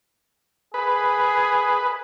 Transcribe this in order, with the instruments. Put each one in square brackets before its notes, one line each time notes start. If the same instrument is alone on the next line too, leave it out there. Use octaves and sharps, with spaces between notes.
[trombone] G#4 [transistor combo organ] B4